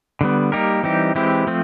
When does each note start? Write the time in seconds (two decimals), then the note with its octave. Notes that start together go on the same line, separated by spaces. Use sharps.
0.21 D3 G3 B3
0.52 G3 A#3 D#4 G4 A#4
0.83 E3 G3 C4 D#4 G4
1.15 E3 G#3 C4 E4 G4
1.47 F3 A3 C4